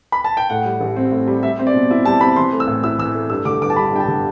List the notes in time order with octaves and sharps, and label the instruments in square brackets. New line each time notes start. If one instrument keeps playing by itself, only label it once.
[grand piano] B5
A5
G5
[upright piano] A2 [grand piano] F#5
[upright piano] G3
A1
C4
A2
G3
[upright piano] G3 [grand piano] E5
[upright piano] C4
[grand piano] D5
[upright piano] B2
E4
[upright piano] G3 [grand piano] A5
[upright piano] C4 [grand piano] B5
[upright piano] E3 [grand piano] C6
[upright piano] A3
[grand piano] E6
[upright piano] A2
[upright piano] E4 [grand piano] E6
[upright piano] E3 [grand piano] E6
[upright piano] A3
[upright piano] G2 [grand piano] E6
[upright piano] D3 [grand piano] D6
[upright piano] G1 [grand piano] D6
[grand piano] A5
[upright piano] G3 [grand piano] B5
[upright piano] G2 [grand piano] G5
[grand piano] A5
[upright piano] D3